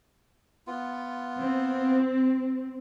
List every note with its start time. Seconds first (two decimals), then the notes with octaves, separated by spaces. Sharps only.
0.67 B3 F4
1.39 C4